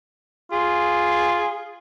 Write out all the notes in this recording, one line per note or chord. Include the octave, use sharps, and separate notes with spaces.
F4 G#4